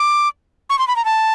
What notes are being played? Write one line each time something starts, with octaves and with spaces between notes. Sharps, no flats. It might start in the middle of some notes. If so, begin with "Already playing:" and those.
Already playing: D6
C#6
C6
B5
A#5
A5